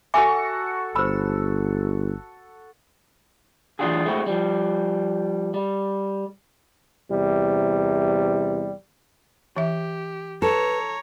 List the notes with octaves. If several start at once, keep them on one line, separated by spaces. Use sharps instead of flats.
F#4 A4 E5 G#5 C#6 D6
G1 C5 B5 E6
E3 F#3 D4 F4 F#4 G#4
G#3 A3 C4 E4 F#4
F3 G3
G3
E2 C3 G3
E3 G4 E5
A4 B4 C#5 A#5